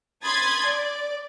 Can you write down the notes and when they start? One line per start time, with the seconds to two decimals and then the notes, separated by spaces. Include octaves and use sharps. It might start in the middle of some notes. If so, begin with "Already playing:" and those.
0.24 B5 C6 D#6 G#6 A6
0.66 D5